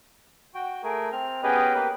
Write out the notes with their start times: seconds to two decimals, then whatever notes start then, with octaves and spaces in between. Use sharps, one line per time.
0.54 F#4 G5
0.83 A3 G#4 A#4
1.12 C4 F6
1.43 B3 C#4 G4 G#4 B4 D#5
1.74 A#3 G4 B4